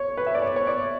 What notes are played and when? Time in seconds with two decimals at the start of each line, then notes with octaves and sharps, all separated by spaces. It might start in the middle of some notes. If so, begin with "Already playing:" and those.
Already playing: C#5
0.17 B4
0.27 E5
0.35 D5
0.42 C#5
0.56 C#5
0.67 D5